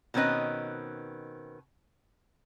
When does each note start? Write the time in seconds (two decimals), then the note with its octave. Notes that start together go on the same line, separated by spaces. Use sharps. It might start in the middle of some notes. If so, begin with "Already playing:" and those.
0.14 B2 D#3 C4 C#4 B4 D#5